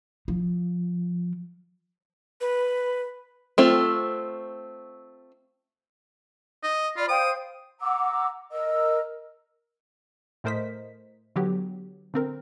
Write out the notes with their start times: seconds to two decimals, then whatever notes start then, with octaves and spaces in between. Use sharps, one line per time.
0.28 F3
2.41 B4
3.58 A3 C4 F4
6.63 D#5
6.96 F4 D5 B5
7.08 C5 F5 G5 D#6
7.81 F#5 A#5 D6 E6
8.51 A#4 D#5 E6
10.44 A2 A3 A#4 C5 D#5 B6
11.36 D3 F#3 B3 G4
12.14 D3 C4 A#4